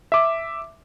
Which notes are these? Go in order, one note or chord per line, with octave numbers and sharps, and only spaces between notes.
E5 D6